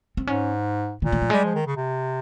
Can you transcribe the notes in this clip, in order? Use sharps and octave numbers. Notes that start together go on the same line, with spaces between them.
C4
G#2 C#4
A#2 D#3
D#3
F3
G3 G#3
F3
D#3
C#3
C3